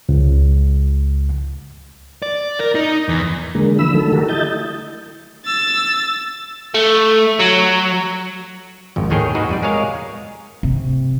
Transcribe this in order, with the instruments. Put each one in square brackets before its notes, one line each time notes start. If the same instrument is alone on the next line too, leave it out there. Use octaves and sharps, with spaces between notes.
[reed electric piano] C#2
[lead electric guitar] D5
A#4
D#4
E2
[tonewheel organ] D3 G#3 A#3
D3 E3 F3 B5 E6
D3 D#3 F#3 A3 A4
A3 F#4 G4 A4 A#4
E4 D#5 G6 A6
[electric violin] E6 A6
[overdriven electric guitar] A3
F#3
[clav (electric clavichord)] G#1 F2
D#2 A2 D#3 G#4 C#5 G5
D#4 F#4 G#4 B4
F2 G3 D5
G#3 G#4 A#4 C#5 F5
[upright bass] C3